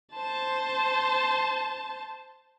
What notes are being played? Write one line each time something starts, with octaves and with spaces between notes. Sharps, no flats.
C5 A5